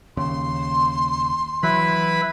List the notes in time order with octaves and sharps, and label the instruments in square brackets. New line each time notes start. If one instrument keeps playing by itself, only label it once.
[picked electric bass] D#2 C#3 [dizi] C6
[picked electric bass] E3 F#3 [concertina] E4 B4 B5